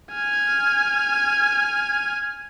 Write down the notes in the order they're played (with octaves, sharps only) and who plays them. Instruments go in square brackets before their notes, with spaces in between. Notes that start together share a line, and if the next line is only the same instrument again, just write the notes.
[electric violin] G#5 F6